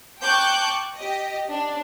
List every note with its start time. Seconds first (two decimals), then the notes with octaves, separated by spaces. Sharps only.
0.22 G5 A5 C#6 D6 F#6 G6
0.95 G4 D#5
1.51 D4